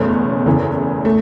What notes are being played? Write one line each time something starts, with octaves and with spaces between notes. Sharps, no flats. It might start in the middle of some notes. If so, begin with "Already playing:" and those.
Already playing: F#1 E2 B2 A3 C#4
F#1 E2 C#3 E3
A3